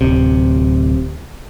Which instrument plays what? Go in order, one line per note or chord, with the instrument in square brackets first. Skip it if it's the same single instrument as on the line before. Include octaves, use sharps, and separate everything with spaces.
[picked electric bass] D1 C3